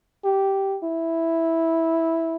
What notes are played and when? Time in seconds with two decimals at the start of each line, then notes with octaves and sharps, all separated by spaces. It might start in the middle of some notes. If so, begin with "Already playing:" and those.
0.24 G4
0.83 E4